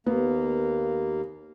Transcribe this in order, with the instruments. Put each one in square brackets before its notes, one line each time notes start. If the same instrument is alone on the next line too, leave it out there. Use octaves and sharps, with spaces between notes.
[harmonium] D#2 A#3 [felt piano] B3